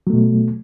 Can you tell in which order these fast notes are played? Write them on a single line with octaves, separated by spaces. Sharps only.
F#3 A3 B2